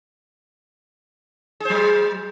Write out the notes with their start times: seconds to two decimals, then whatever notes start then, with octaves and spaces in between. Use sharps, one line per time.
1.60 G#4
1.65 C5
1.70 F#3